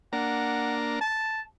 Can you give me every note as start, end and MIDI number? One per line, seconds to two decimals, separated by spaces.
0.13 0.99 58
0.13 0.99 62
0.13 0.75 78
0.13 0.99 82
1.01 1.42 81